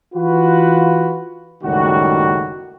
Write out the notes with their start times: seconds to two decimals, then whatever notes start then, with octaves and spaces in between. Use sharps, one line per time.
0.15 E3 F4 F#4 B4
1.64 F#1 C#2 A2 D#3 G3 F#4